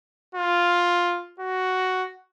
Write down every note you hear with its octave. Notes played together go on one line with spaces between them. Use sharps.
F4
F#4